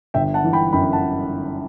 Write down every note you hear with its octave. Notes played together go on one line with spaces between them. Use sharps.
G1 E5 G5
F#5 A5
E3
G5 B5
F#2 G5 B5
F#5 A5